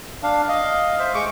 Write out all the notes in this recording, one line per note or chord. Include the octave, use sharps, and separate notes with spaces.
D4 F5
D#5 F5
C5 E5
G#3 C#6 D6